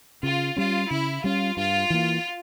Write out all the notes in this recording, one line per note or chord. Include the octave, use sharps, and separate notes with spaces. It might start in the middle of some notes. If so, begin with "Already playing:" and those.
C#3 F4
G3 C#4 F4
C#3 E4
G3 C#4 F4
G2 F4
E3 A#3